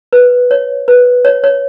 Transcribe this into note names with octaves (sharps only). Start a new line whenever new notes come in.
B4
C#5
B4
C#5
C#5